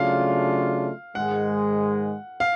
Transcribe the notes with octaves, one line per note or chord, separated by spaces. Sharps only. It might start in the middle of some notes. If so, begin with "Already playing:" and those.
Already playing: C#3 F#3 A3 D4 F4 F5
G#2 D#3 G#3 F#5
F5